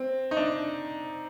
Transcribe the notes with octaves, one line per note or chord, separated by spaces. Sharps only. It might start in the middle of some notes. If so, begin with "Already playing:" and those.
Already playing: C4
D#4
D4